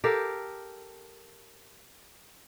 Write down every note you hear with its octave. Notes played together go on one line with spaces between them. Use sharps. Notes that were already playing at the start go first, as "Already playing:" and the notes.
G4 A4 A#4 F5